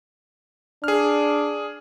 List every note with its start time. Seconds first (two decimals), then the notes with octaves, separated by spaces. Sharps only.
0.84 D4 G#4 F6